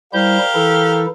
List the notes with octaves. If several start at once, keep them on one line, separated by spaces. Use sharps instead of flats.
G3 E4 G4 A#4 C5 F5 G6
E3 E4 A4